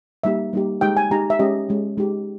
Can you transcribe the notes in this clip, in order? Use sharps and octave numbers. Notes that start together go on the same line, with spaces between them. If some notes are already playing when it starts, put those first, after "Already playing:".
G3 A#3 D#4 G4 E5
G3 A#3 D#4 G4
G#3 D#4 G4 G5
G#5
G#3 D#4 G4 A#5
E5
G#3 C#4 G4 D#5
G#3 C#4 G4
G#3 D#4 G4